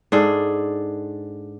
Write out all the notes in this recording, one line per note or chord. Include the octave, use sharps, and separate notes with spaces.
G#2 D4 G#4 A4